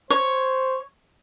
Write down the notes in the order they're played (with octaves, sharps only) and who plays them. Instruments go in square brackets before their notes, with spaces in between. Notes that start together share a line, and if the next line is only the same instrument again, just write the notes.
[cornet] C5 [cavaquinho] C#5